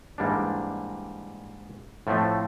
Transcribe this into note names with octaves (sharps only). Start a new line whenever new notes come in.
G#2 E3 G3 A#3 D4
A2 F3 A3 C4